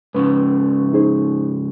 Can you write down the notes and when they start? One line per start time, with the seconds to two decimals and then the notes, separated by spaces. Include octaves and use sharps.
0.14 G#2 C#3 B4
0.93 D#4 G#4 C5